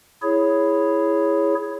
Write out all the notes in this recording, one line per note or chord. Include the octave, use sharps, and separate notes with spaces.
E4 G#4 C#5